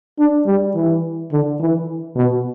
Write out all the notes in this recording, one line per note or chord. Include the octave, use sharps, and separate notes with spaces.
D4
G3
E3
D3
E3
B2